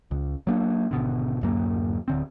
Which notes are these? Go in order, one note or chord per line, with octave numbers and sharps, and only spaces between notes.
C#2
F#3 A#3 D4
G#1 B2 D3
D1 F#2 A#3
D1 D3 C4